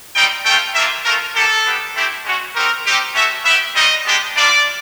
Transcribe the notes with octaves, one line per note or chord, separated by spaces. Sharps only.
G3 C4 D#4 G5
A3 C#4 F4 G5
A#3 D4 F4 E5
A3 C#4 F4 A#4
A#3 D4 G4 A4
B3 D4 G4
A3 C4 E4 G4
G#3 C#4 F#4
C4 D#4 G4 A#4
C4 D#4 G4
A3 C#4 F#4 E5
B3 E4 G4 E5
G3 C4 D#4 F#4 D#5
G#3 B3 D4 G4
G3 A#3 D4 F4 D5